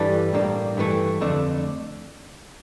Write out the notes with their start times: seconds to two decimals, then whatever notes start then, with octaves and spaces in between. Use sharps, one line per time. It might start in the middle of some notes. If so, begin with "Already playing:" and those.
Already playing: G2 E3 G3 D4 A4
0.33 A2 G3 A#3 D4
0.77 G2 E3 A3
1.21 F2 D3 A3 D4